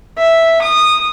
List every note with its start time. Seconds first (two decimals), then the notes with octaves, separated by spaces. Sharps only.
0.18 E5
0.62 D#6